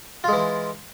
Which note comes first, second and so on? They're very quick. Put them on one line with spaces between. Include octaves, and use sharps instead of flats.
F4 G#3 E3